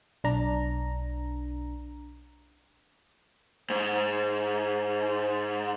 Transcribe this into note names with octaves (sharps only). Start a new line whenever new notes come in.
B1 D4 A#5
G#2 C5